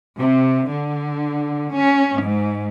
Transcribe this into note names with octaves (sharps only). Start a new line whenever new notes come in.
C3
D3
C#4
G#2